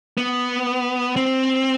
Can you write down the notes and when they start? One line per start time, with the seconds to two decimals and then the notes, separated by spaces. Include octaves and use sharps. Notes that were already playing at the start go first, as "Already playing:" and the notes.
0.17 B3
1.16 C4